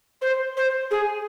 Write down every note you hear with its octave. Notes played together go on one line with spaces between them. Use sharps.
C5
C5
G#4